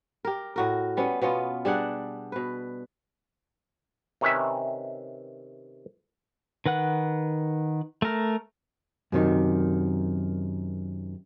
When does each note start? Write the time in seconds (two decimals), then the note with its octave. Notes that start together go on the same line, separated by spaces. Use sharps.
0.25 G4 A#4
0.56 A2 F#4 A#4
0.97 G3 B3 C#4
1.22 B2 B3 C#4 F4
1.65 G3 D4 G#4 F#5
2.32 B2 B4
4.21 C3 D#3 C#4 B4 E5
6.66 D#3 B4 F#5 F#6
8.02 A3 A#4
9.12 F#2 C3 D#3